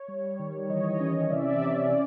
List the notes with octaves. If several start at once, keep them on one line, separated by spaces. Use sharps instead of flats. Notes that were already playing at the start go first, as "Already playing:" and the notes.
Already playing: C#5
G3
D#3
E3 C#5 D#5
C#4
C3 D5 E5
C#4
D5